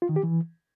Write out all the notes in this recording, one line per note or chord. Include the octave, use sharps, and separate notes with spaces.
F4
D#3
G4
E3